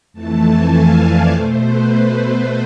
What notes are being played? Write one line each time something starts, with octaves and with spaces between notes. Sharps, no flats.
F2 E3 A3 A5
G#5
F5
D5
B2 A3 C5
B4